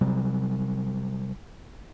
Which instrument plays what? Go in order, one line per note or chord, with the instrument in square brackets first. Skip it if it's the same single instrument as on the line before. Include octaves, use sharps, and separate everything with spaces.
[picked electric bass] C3 F#3 G3